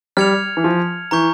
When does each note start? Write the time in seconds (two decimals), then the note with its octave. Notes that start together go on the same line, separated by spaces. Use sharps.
0.17 G3 F6 G#6 C#7 F7
0.57 E3
0.64 F3
1.11 E3 A#5 C#6 G6